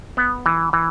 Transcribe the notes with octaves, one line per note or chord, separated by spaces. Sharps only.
B3
E3
E3